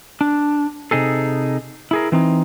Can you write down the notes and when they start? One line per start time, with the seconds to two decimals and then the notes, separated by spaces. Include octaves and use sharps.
0.21 D4
0.91 C3 D#4 G#4 A4
1.91 E4 G#4 A#4
2.12 E3 C4 D#4